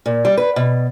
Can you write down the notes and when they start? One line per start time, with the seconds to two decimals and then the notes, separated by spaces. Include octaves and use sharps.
0.06 A#2
0.25 G3
0.37 B4
0.56 B2